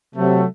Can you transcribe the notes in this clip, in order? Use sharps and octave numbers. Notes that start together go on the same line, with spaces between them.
C3 F#3 A3